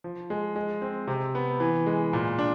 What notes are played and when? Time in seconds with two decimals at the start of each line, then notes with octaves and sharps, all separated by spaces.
0.04 F3
0.30 G#3
0.56 G#3
0.82 C4
1.08 C3
1.35 B3
1.60 E3
1.86 G#3
2.13 A#2
2.39 D4